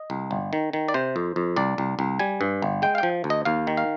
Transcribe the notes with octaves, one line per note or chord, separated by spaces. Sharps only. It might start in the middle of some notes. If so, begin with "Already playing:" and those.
Already playing: D#5
C2
G1
D#3
D#3
D5
C3 C5
F2
F2
C2 D5
C2
C2
G3 G#5
G2
G1
G#3 G5
F5
F3 G5
D2
D#5
D#2 F5
D#3
F5